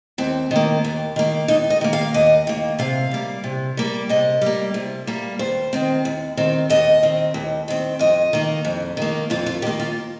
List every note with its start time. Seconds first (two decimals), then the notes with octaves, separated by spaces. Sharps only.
0.18 D#2 C4
0.51 D#3 A#3
0.84 D#2
1.16 D#3 A#3
1.48 D#2 D#4
1.70 D#5
1.81 D#3 A#3
1.93 F5
2.14 D#2 D#5
2.47 D#3 A#3
2.79 C3 F5
3.11 G3 A#3
3.44 C3
3.77 G3 A#3
4.09 C3 D#5
4.42 G3 A#3
4.74 C3
5.07 G3 A#3
5.39 D#2 C5
5.73 D#3 C4
6.05 D#2
6.37 D#3 C4
6.70 D#2 D#5
7.03 D#3 C4
7.34 D#2
7.68 D#3 C4
7.99 F2 D#5
8.33 D#3 A#3
8.65 F2
8.97 D#3 A#3
9.30 F2 F4
9.46 F4
9.62 D#3 G4
9.67 A#3
9.80 F4